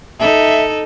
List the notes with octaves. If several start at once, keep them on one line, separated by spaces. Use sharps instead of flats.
D#4 A4 E5